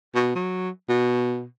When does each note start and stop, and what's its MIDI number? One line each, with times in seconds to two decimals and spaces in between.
0.14 0.35 47
0.35 0.69 54
0.89 1.44 47